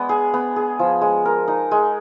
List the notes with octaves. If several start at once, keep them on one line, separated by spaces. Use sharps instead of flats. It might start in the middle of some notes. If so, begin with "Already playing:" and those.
Already playing: G#3 B3 D4
G#4
B3
G#4
F3
G#3
A#4
D#4
G#3